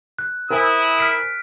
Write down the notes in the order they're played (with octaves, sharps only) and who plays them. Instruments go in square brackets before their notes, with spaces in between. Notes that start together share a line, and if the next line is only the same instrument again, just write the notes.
[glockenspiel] F#6
[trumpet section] E4 [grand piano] A#4 C5 G#5 [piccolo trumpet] D#6
[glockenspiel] F6 B6 D7